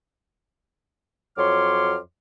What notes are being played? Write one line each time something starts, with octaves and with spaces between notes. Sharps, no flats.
F2 F#3 C#5 C6 D6 F6